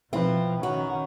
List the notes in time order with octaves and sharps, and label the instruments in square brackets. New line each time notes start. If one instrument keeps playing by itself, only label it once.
[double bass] B2 F3 [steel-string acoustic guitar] C4 [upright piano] E4 B4
[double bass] D#3 C#4 [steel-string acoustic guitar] F#4